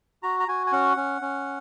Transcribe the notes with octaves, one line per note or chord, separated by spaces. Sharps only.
F#4 A#5
A#5
F#4 G#5
G#5
C#4 F#5
C#4
C#4